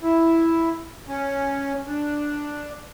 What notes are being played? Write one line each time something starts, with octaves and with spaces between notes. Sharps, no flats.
E4
C#4
D4